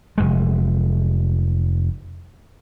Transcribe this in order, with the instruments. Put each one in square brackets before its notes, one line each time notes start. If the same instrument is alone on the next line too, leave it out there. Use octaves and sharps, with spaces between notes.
[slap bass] F1 C2 G#3